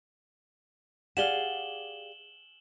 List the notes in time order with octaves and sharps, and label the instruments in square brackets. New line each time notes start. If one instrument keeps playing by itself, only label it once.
[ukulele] G4 F#5 [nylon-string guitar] G#4 D5 F5 [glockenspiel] E7 F#7 G7